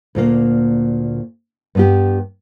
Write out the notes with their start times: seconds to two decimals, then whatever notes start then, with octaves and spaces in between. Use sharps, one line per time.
0.15 D2 A#2 A#3
1.75 G2 B3 G4